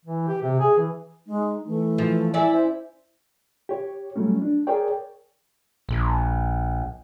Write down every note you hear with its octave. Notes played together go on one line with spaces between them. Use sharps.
E3
G4
C3
G#4
E3
G#3 D#4
E3 A3
F3
E4 D5 G#5
C#4 C5
G4 C#5
F#3 G3 A3 C#4
D4
G#4 A#4 C#5 D5 G5
A#1